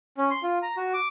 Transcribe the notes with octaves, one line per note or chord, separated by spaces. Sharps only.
C#4
C6
F4
A#5
F#4
D6